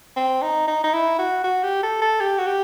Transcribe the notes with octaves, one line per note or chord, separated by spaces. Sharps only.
C4
D#4
D#4
D#4
E4
F#4
F#4
G4
A4
A4
G4
F#4
G4